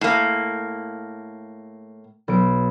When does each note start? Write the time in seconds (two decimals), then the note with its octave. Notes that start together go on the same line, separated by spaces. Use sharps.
0.01 A2 A#3
2.28 B1 D7